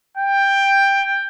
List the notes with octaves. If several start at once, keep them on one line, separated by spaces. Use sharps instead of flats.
G5